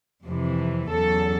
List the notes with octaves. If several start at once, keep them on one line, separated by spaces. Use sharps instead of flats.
F2 C3 E3
E2 C#3 F#3 A4